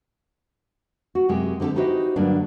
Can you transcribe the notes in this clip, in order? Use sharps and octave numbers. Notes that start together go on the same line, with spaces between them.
F#4
F#2 C3 G#3 G4
D3 C4 D#4 G4 A4
D#4 E4 F#4 G4 C5 D#5
G2 D3 F#3 A#3 D4